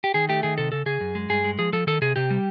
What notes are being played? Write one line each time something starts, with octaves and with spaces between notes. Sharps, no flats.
G4
D#3 G#4
A3 G4
D#3 G#4
C3 A4
C#3 A4
C#3 G#4
F#2
G#3
G2 G#4
G#3
F3 G#4
F3 A4
D#3 A4
C3 G#4
C3 G4
G3